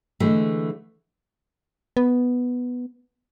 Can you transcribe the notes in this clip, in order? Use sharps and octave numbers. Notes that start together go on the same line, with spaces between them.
D3 E3 G#3 A3
B3